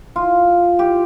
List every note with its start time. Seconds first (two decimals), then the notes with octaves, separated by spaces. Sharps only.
0.16 F4
0.79 G4